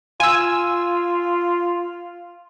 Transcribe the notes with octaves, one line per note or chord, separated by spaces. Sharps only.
F4 G#5 E6